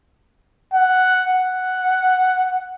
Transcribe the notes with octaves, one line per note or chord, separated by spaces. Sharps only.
F#5
F#5